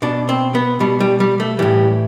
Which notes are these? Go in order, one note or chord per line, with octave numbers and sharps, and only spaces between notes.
B2 D4
C4
B3
B2 G3
G3
G3
A3
A2 E3 G3